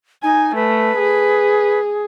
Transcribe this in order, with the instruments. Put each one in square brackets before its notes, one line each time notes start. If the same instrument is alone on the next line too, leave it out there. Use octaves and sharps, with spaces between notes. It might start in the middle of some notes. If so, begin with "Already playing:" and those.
[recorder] D#4 [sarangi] G#5
[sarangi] A3 [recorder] B4
[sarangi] G#4